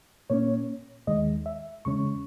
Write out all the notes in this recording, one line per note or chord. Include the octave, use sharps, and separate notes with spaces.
A#2 A#3 C#4 C#5
D#2 D#3 G#3 D#5
E5
E2 C#3 G#3 C#4 C#6